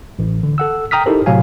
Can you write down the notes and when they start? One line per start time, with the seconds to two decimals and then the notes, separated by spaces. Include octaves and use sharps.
0.19 A1
0.43 D3
0.58 A4 F#5 E6
0.91 G5 A#5 D#6 F6 B6
1.06 D#4 E4 G4 A4 A#4 C5
1.26 A2 C3 F#3 F5 G#5